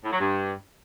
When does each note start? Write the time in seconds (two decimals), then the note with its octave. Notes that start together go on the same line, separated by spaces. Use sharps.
0.04 A2
0.12 F#3
0.20 G2